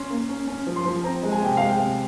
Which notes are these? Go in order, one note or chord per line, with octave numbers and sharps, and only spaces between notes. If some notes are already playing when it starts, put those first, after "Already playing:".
Already playing: C#4 C6
A#3
C#4
C#4
F3
C6
F3
C4 A#5
G#3
G#5
C3 G5
G#3 F5
G5
C3